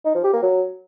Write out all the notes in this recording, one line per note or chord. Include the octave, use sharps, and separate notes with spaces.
D#4
F3
G4
A#3
F#3